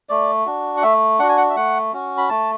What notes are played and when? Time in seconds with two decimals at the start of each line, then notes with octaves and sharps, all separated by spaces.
0.09 A3 D5
0.46 D4 F#4
0.77 F#5
0.83 A3 E5
1.19 D4 F#4 F#5
1.29 G#5
1.37 F#5
1.50 E5
1.56 A3 F#5
1.93 C#4 F#4
2.18 B5
2.29 A3 A5